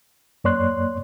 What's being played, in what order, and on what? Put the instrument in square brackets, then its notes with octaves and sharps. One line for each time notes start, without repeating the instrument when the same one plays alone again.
[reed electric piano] F#2 A#3 C#5 D5 C6 F#6